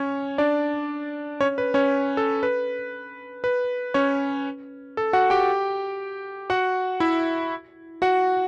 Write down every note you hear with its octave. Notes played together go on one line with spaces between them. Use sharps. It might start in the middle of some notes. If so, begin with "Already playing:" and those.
Already playing: C#4 C#5
D4 D5
C#4 C#5
B4
C#4 C#5
A4
B4
B4
C#4 C#5
A4
F#4 F#5
G4 G5
F#4 F#5
E4 E5
F#4 F#5